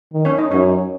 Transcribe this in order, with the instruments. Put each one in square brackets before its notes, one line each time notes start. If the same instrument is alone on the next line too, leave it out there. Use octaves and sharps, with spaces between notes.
[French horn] D#3
[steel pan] C#4 C#5
D#4 D#5
[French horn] F#2 [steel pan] C#4 C#5